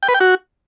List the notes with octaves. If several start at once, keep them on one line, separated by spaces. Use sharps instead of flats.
G5
B4
G5
F#4